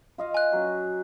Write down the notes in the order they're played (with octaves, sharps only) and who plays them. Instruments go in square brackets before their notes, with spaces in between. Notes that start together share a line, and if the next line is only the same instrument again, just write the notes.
[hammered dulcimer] F4 D#5 F5
[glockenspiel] G#5 F#6
[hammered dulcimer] F#3 C#4